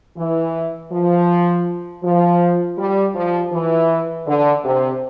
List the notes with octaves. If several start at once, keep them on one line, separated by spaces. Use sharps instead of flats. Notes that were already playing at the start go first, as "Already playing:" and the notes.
E3
F3
F3
G3
F3
E3
D3
C3